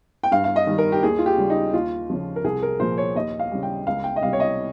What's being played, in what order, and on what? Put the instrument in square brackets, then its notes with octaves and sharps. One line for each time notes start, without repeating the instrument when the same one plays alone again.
[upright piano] G5
G2 F5
F5
D#5
D#3 G3
A#4
G4
D#2 G#4
F4
G4
C#3 G3
D#4
D#2 F4
C#3 F3
A#4
C2 G#4
A#4
A#2 F3 C5
C#5
D#2 D#5
F5
C#3 G3
G5
C#2 F5
G5
D#5
C3 G3 F5
C#5
D#5